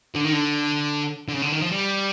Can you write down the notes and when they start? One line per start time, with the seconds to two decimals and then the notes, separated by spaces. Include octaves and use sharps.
0.15 D3
0.25 D#3
0.33 D3
1.28 D3
1.33 C#3
1.42 D3
1.52 D#3
1.62 F3
1.72 G3